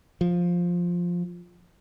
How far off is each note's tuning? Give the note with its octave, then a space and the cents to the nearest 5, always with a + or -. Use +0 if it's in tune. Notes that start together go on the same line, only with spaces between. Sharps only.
F3 +5